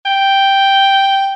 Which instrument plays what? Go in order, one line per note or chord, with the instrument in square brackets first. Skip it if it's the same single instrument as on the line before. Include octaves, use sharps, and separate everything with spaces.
[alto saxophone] G5